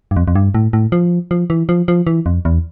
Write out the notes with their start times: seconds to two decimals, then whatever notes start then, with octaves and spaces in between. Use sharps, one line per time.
0.11 G2
0.16 F2
0.28 F2
0.36 G2
0.55 A2
0.73 A2
0.92 F3
1.31 F3
1.50 E3
1.69 F3
1.88 F3
2.07 E3
2.26 F2
2.45 E2